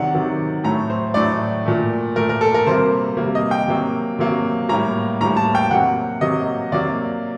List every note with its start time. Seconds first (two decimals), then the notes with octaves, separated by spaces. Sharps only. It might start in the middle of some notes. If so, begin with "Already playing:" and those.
Already playing: C3 D#3 F#3 D5 F#5
0.14 C3 D#3 F#3
0.64 A2 F#3 A3 A#5
0.90 C5
1.14 A2 F#3 A3 D5
1.66 A#2 A3
2.16 A#2 A3 A#4
2.29 A#4
2.41 A4
2.54 A#4
2.66 C3 G3 A#3 C5
3.17 C3 G3 A#3
3.35 D#5
3.51 G5
3.68 C3 F#3 A#3
4.19 C3 F#3 A#3
4.69 A2 G3 A#3 A#5
5.21 A2 G3 A#3 A#5
5.37 A5
5.55 G5
5.71 C3 F#3 A#3 F#5
6.21 C3 F#3 A#3 D#5
6.72 C3 F#3 A#3 D5